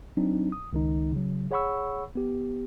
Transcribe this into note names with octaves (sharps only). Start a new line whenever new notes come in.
F#3 C4 D4 D#4
D#6
C#2 D#3 D#4
C#3 F#3
G#4 C#5 F#5 B5 C#6 E6
B3 G4